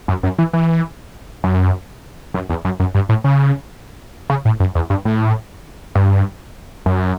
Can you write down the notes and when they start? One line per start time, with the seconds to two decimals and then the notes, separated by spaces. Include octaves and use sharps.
0.08 F#2
0.23 F#2
0.38 E3
0.53 E3
1.44 F#2
2.34 F#2
2.49 E2
2.65 F#2
2.80 F#2
2.95 G2
3.09 A2
3.24 C#3
4.30 C#3
4.45 A2
4.60 F#2
4.75 E2
4.90 G2
5.05 A2
5.95 G2
6.86 F#2